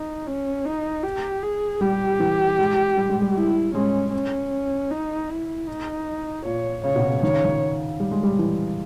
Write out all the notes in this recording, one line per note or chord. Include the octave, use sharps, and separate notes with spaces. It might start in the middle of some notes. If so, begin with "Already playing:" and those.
Already playing: D#4
C#4
D#4
G4
G#4
G3 G4
E3
G#3
G3
G#3
G3
E4
G#3 C#4
C#4
D#4
E4
D#4
A#2 C#5
C#3 C#5
B2
C#3
D#3 C#5
C#3
D#3
G3
G#3
G3
E3